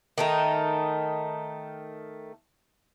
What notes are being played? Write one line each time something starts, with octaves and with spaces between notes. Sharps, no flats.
D#3 A3 D#4